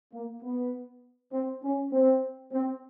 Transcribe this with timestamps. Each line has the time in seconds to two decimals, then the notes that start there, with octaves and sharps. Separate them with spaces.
0.13 A#3
0.43 B3
1.33 C4
1.63 C#4
1.92 C4
2.52 C4